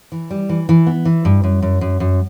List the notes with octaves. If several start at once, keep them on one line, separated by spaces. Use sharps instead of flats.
E3
G3
E3
E3
B3
E3
G2
F#2
F#2
F#2
F#2